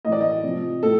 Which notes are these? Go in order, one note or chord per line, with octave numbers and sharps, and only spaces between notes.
A2 E3 D5 D#5
D#5
C3 F3
A2 A4